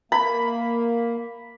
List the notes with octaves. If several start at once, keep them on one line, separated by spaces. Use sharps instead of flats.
A#3 B5